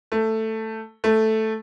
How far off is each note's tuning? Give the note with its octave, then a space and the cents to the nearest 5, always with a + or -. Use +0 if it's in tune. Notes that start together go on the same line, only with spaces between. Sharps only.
A3 +10
A3 +0